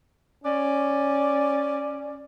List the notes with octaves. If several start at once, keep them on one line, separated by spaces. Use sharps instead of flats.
C#4 D5